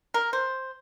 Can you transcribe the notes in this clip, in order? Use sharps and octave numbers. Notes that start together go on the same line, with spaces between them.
A#4
C5